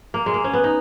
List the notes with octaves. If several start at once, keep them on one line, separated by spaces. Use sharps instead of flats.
A#3
G#3
A#3
C#4
B3
D#4